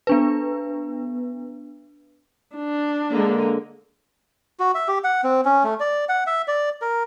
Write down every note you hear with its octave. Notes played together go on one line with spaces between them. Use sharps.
B3 D4 B4
D4
D3 G#3 A#3
F#4
E5
G4
F#5
C4
C#4
A3
D5
F#5
E5
D5
A#4